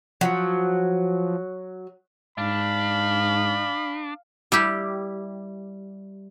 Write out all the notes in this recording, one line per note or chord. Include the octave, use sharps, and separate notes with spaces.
F3 F#3
G#2 D4 F5 B5
G3 E4 G4